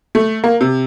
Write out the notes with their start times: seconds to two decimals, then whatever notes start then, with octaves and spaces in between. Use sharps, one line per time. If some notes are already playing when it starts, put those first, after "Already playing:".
0.15 A3
0.44 A#3
0.61 C3